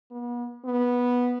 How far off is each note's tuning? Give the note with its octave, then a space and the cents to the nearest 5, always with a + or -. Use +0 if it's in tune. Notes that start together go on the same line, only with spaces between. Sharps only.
B3 -40
B3 -10